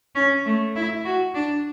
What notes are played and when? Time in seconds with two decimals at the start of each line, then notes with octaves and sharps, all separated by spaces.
0.15 C#4
0.45 A3
0.76 E4
1.05 F#4
1.35 D4